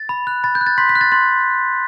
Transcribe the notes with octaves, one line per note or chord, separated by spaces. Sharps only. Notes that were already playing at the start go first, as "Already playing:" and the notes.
Already playing: A6
B5
F#6
B5 A6
G6
F#6
A6
C6 B6
B6
F#6
A6
C6 A6